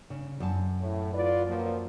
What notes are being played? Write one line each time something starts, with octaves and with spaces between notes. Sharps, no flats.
C#3
F#2 A5
A2
F4 B4 D5
F3 F#3 A#3